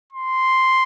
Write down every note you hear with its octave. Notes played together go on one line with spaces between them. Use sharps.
C6